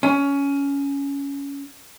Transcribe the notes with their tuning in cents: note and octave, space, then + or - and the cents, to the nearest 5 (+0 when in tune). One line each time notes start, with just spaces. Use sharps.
C#4 +15